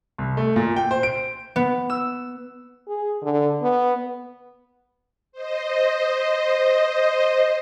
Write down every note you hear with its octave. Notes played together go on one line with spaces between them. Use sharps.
C2
A3
A#2
G5
C5
D7
B3
E6
G#4
D3
B3
C5 D#5